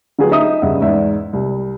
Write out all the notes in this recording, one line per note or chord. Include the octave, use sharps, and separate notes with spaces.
D3 F#3 F4 G4 G#4 B4
D#4 E5 D#6
G1 G2 C#3 E5 F#5
E2 G#2 E5
C2